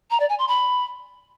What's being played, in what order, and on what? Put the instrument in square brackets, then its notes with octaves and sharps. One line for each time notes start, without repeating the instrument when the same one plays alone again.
[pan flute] A#5
D5
G#5
C6
B5